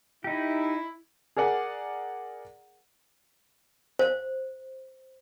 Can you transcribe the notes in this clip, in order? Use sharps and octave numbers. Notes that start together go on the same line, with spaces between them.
D#4 E4 G4
G#4 A#4 D5 F#5 G#5
C5